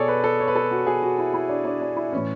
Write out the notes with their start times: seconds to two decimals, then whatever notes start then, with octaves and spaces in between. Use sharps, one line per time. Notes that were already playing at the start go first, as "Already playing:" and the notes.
Already playing: B2 G#4 A4 C#5 D5
0.08 B4
0.24 A4
0.40 C#5
0.48 B4
0.55 A4
0.71 F#4
0.87 G#4
1.03 F#4
1.18 E4
1.34 E4
1.49 D4
1.65 D4
1.81 D4
1.96 E4
2.13 A2 E3 C#4